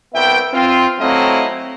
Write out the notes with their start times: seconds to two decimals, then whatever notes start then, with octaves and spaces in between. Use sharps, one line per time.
0.15 C2 B3 E5 G5
0.54 C4 F4
1.01 F#3 A3 C4 E4 D#5 F5